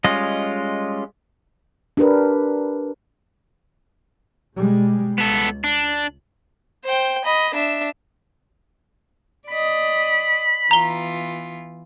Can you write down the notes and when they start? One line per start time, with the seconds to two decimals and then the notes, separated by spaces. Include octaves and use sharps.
0.04 G3 G#3 C#4 F4 D#5
1.97 D4 G4 A#4 B4
4.56 B2 G3 G#3
5.18 C#2 B3 A4
5.64 D4
6.85 C5 G5
7.25 D#5 B5
7.54 D4 E5
9.48 D5 D#5 B5
10.71 E3 B3 F4 A#5 G7